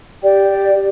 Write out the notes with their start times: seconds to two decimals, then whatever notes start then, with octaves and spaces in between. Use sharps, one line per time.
0.22 G4 D5 G5
0.75 G4